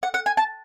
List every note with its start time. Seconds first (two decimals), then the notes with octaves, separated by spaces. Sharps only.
0.03 F#5
0.14 F#5
0.26 G#5
0.37 A5